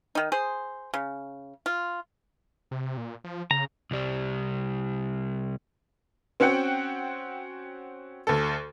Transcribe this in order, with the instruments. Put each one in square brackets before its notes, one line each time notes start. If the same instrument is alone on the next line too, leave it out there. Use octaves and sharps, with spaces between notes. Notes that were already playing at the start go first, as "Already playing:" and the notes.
[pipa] D#3 D#4
G#4 C5
C#3
F4
[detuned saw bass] C3
A#2
F3
[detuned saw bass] C#3 [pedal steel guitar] A#5
[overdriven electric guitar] C2 G3
[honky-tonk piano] C4 C#4 F#4 F#5 G5
D2 A4